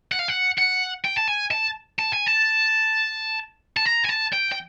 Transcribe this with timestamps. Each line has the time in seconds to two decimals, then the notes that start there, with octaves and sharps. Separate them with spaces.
0.12 F#5
0.19 F5
0.28 F#5
0.58 F#5
1.05 G5
1.18 A5
1.28 G#5
1.51 A5
1.99 A5
2.13 G#5
2.26 A5
3.77 A5
3.85 A#5
4.05 G#5
4.09 A5
4.33 G5
4.52 G5